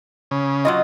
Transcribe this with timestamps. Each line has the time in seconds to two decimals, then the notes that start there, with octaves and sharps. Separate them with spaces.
0.31 C#3
0.65 F#3 F4 D#5